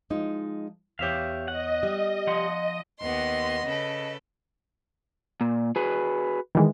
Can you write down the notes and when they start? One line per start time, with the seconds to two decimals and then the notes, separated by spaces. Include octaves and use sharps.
0.10 F3 G#3 D#4
0.99 E2 G4 C#5 E5 F5
1.48 D#5 F#5
1.83 G3
2.27 F3 F#5 C6
2.99 D#2 B3 D#5 C6
3.66 C#3 A4 B4
5.41 A#2
5.76 F#4 G#4 B4
6.55 D#3 E3 G#3